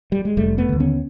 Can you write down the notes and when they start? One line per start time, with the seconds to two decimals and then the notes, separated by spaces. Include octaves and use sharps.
0.12 G3
0.25 G#3
0.37 F1 G3 A3
0.58 A3 B3
0.69 D#2 D3
0.80 B3 C#4